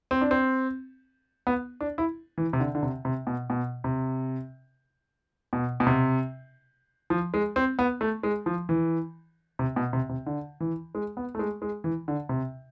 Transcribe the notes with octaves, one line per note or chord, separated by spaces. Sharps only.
C4
D4
C4
B3
D4
E4
E3
C3
D3
D3
C3
C3
B2
B2
C3
B2
B2
C3
F3
G#3
C4
B3
A3
G#3
F3
E3
C3
B2
C3
C3
D3
E3
G#3
B3
A3
G#3
G#3
E3
D3
C3